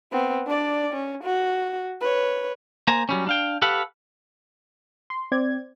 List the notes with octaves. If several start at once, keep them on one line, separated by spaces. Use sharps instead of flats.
B3 C4
D4 D5
C#4
F#4
B4 C#5
A#3 C5 G#5 A#5
F#3 G3 C#4
D4 F5 G5
G4 A4 B4 F5 F#5
C6
C4 D5 G#6